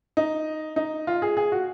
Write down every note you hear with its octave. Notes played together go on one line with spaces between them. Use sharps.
D#4
D#4
F4
G#4
G#4
F#4